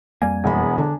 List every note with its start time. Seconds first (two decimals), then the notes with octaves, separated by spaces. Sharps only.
0.22 F2 G3 A#3 G#5
0.44 E1 E2 B3 B5
0.78 D3 D4